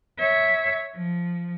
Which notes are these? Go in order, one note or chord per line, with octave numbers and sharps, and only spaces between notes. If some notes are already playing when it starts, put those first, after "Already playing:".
C#5 E5
F3